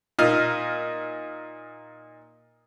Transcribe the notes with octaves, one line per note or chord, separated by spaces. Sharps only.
A#2 D#4 F6